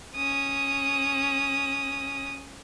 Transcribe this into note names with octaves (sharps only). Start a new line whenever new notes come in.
C#4 D#6